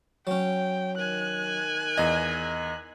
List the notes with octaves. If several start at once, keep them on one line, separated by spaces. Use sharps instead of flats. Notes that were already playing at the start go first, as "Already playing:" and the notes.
F#3 C#4 G5
D#3 G#5 F#6
E2 D#5 F5